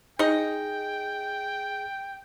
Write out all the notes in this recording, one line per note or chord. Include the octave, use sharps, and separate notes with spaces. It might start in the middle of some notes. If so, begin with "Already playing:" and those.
D#4 G#4 D#5 G5